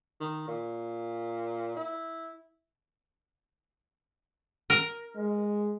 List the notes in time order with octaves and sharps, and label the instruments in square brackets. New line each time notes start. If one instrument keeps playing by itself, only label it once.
[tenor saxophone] D#3
A#2
E4
[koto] A#4
[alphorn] G#3